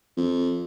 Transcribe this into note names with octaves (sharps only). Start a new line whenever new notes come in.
F2